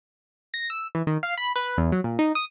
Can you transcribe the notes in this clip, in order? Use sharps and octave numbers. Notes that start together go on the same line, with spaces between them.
A#6
E6
E3
D#3
F5
B5
B4
E2
F#3
A#2
D#4
D#6